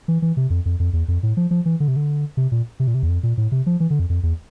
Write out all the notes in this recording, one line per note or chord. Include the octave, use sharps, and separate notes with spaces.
E3
E3
C3
F2
F2
F2
E2
F2
A2
F3
F3
E3
D3
C3
D3
C3
A#2
C3
A#2
C3
E2
F2
A#2
A2
C3
F3
E3
D3
F2
F2
E2